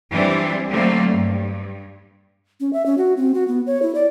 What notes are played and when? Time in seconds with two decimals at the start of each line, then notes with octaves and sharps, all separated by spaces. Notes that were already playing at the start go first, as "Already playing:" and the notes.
0.11 E3 G3 C4 D4 E4
0.70 D3 F#3 G3 A3 A#3 C4
1.10 G2
2.60 C#4
2.73 E5
2.86 C#4
2.98 F#4
3.17 C4
3.35 F#4
3.48 B3
3.67 C#5
3.82 E4
3.95 D5